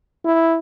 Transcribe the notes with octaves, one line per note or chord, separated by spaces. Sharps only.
E4